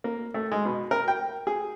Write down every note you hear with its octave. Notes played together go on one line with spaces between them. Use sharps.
A#3
A3
G#3
B2
A#4
G5
G#4